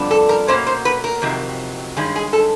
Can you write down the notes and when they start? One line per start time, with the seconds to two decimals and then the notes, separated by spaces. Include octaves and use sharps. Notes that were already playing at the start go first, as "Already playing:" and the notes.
Already playing: F2 D3 G3 B3 D4
0.11 A4
0.29 A#4
0.48 B2 F#3 A#3 C#4 C5
0.67 C5
0.85 B4
1.04 A#4
1.22 F2 C3 D#3 F#3
1.97 G2 D#3 G#3 C#4
2.16 G#4
2.33 A4